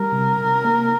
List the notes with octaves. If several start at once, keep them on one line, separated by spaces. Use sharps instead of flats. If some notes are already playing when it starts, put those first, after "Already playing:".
Already playing: G3 A#4
C3
C3
A#3